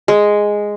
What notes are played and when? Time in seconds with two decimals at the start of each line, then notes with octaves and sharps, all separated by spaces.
0.08 G#3